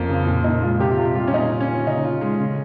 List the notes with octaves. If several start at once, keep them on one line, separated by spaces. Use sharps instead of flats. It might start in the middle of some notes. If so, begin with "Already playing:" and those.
Already playing: F2 A#3 C#4
C#3
A#2
A#2 D#4
G#3 F4
C3 G4
C3 F4
G3 F4
C#4
A#2 D#4
F4
C#4
F3
C#3 D#4
F4
G#3
C#3